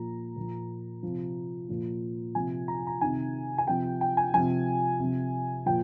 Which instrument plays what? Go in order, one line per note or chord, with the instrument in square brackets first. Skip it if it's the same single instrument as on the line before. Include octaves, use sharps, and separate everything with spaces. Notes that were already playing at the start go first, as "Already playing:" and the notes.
Already playing: [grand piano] A#2 F3 A#5
A#2 F3
C3 F3
A#2 F3
C3 F3 G#5
A#5
A#5
C3 D#3 G#5
G#5
C3 F3 G5
G5
G#5
C3 F3 G#5
C3 F3
A#2 F3 G5